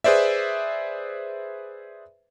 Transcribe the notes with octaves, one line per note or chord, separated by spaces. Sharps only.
G#4 B4 C5 D5 E5